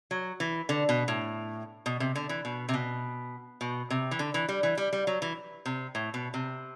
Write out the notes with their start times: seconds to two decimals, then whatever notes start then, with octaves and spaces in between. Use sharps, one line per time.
0.11 F#3
0.40 E3
0.69 D3
0.89 B2
1.08 A2
1.86 B2
2.00 C3
2.15 D3
2.29 E3
2.45 B2
2.69 C3
2.74 B2
3.61 B2
3.90 C3
4.11 E3
4.19 D3
4.34 E3
4.49 G3
4.63 E3
4.78 G3
4.93 G3
5.07 F#3
5.22 E3
5.66 C3
5.95 A2
6.14 B2
6.34 C3